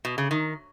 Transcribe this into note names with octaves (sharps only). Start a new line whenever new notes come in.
B2
C#3
D#3